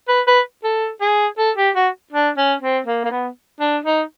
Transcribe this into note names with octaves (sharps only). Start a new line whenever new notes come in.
B4
B4
A4
G#4
A4
G4
F#4
D4
C#4
C4
A#3
A#3
B3
D4
D#4